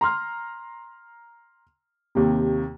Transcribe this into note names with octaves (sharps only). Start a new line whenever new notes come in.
A#5 C6 F6
D#2 C3